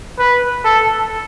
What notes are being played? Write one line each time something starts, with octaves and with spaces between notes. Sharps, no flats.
B4
A4